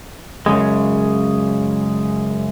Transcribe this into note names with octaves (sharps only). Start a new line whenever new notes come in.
F#2 A#2 C#3 G#3